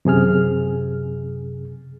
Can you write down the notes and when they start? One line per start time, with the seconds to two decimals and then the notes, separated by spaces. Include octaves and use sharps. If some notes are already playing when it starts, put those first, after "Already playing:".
0.05 F#2 C3 G#4 F6